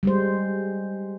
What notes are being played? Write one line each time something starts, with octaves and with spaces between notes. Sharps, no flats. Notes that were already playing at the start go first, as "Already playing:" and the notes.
G3 G#3 C5